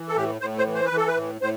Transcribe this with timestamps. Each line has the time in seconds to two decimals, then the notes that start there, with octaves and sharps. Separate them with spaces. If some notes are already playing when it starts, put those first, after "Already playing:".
Already playing: E3
0.08 A4
0.16 A2 G4
0.41 A2 C5
0.58 C5
0.66 E3
0.75 C5
0.85 B4
0.92 E3
0.97 A4
1.08 B4
1.17 A2
1.41 A2 C5